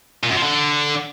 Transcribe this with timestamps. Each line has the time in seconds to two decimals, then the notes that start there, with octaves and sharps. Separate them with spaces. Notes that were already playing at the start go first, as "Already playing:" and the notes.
0.23 A#2
0.30 F#2
0.36 F3
0.43 D3